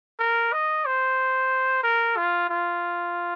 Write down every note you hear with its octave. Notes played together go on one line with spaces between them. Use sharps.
A#4
D#5
C5
A#4
F4
F4